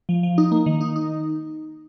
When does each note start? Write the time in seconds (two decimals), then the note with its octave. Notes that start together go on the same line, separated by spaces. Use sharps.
0.09 F3
0.23 F3
0.38 D#4
0.52 A#3
0.66 D#3
0.81 D#4
0.96 D#4